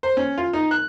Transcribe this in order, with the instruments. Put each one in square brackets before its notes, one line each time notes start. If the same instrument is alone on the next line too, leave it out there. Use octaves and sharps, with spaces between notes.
[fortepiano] C5
C#4
F4
D#4
F#6